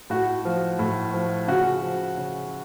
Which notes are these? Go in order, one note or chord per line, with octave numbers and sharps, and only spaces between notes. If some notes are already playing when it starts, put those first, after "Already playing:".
A2 F#4
F3
A2
F3
C#3 F#4
F3
C#3